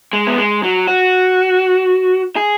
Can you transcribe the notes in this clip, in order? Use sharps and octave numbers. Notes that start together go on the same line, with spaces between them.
G#3
B3
G#3
F#3
F#4
G#4